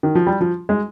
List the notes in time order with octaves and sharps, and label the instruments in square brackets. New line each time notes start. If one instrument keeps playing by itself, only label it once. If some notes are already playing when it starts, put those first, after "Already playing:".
[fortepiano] D#3
F3
G3
F3
G#3